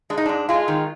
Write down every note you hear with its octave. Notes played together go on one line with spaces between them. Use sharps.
G#3 D4
D#4
G#2 D4
G#3 F4
D#3